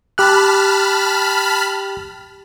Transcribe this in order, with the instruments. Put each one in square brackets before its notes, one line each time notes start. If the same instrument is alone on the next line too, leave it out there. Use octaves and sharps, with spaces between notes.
[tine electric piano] G4 G5 F#6 [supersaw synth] A5 B5 F6